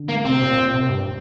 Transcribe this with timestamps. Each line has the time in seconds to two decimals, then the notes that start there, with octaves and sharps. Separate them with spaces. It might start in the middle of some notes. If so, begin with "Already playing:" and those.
Already playing: D3
0.09 A#3
0.25 C3 C4
0.42 A#2
0.57 A#2
0.74 C3
0.89 G2